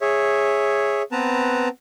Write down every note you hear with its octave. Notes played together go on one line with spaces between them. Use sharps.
G#4 C#5 E5
B3 C4 B4 A5 A#5